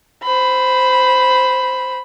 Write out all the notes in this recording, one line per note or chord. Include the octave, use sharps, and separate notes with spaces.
C5 B5